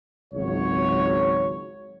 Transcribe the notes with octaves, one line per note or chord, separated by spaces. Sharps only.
G#1 C#2 F#3 C#5